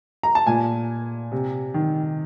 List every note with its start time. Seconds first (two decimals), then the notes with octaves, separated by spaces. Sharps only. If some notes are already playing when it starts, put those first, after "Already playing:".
0.23 A#5
0.35 A5
0.47 A#2 G#5
1.32 C3
1.74 D#3